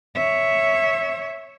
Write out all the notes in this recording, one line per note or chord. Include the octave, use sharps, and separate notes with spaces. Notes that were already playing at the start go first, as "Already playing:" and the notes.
C#5 E5